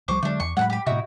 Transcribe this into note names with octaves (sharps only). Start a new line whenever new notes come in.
C2 F3 G3 C5 C#6 D6
D3 F#3 G#3 A3 D4
E2 C#6
A2 F#3 G#3 F#5 A5 B5
G4 B5
A2 C3 D#4 E4 F#4